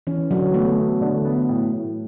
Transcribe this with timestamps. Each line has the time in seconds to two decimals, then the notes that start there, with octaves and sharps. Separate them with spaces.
0.07 E3 C#4
0.30 D3 F#3
0.54 A3 B3
0.78 B3
1.01 D3
1.25 B3
1.49 A2
1.72 A2